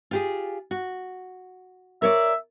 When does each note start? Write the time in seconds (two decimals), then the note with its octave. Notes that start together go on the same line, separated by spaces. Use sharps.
0.11 F4 G4 G#4
0.71 F#4
2.02 A#4 C#5 D5 E5